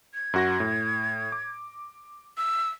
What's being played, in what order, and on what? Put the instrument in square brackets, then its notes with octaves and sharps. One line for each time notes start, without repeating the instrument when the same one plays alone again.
[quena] G#6
[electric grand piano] F#2 F#4 A#6
A2
D6
[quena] E6